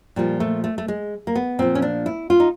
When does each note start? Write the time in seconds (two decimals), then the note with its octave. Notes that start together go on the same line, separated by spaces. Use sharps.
0.16 A#2 F3 G3
0.40 A3
0.64 A3
0.78 A3
0.88 G#3
1.27 A#3
1.35 B3
1.59 A#2 F3 C4
1.75 C#4
1.82 D4
2.06 E4
2.30 F4
2.40 D#4